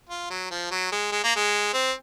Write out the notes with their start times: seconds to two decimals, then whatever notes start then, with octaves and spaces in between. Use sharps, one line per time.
0.09 F4
0.30 F#3
0.51 F3
0.71 F#3
0.92 G#3
1.12 G#3
1.24 A#3
1.36 G#3
1.74 C4